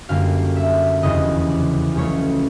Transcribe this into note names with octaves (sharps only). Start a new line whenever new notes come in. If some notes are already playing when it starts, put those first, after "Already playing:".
F#2 D3 G3 A#3 F5
E5
F1 E2 C#3 D#5
D5
C#2 C#3 F#3 A3 C#5